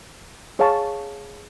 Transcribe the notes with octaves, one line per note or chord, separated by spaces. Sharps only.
G#4 C#5 F5 A5 C#6